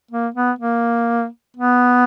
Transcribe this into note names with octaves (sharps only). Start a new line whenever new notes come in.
A#3
B3
A#3
B3